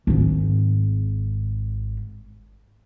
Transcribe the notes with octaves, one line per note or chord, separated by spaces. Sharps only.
G#1 G#2